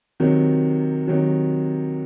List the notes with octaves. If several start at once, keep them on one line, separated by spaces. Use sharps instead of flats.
C3 D#3 F#3
C3 D#3 F#3